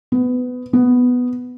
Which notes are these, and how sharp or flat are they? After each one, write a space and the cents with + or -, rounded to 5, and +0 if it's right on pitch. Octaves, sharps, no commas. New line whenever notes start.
B3 +20
B3 +5